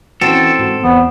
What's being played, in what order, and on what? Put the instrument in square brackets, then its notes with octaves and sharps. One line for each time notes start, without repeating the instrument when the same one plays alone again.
[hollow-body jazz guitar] E3 C#4 F#4 [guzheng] C4 [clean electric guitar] A4
[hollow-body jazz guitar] G#2 F#4 C6
[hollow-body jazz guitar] E2 C5 [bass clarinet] B3